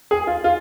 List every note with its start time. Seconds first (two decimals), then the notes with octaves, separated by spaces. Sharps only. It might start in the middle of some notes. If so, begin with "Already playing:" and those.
0.11 G#4
0.27 F4
0.44 F4